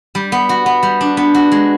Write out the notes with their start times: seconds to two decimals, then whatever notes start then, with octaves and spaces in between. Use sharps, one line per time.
0.15 G3
0.32 B3
0.49 F#4
0.66 B3
0.83 G3
1.01 D4
1.17 B3
1.35 F#4
1.52 G#3